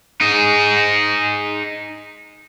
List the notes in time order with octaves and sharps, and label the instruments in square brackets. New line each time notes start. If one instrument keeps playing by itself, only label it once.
[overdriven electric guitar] D#4 G#4